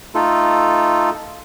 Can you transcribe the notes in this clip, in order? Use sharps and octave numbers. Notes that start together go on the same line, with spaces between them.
A3 D#4 F4 A4